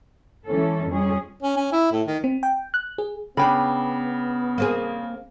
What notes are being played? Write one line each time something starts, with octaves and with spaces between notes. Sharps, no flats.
E3 G#3 C#4 A4
F2 G3 C#4 G#4
C#4
C#4
E4
A2
D#3
C4
G5
F#6
G#4
C#3 B3 D4 G5 B5
A#3 C4 G#4